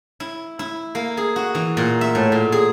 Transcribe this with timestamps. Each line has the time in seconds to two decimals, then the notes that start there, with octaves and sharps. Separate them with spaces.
0.20 E4
0.59 E4
0.95 A#3
1.17 G#4
1.36 F#4
1.55 E3
1.77 A#2
2.01 E5
2.15 A2
2.32 A#2
2.52 G#4